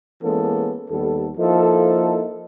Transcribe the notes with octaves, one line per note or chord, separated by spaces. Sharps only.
E3 G#3 A#3 B3 C#4 A4
D#2 G3 B3 A4
F3 A#3 D#4 E4 A4